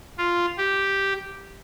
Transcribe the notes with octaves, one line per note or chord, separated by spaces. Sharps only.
F4
G4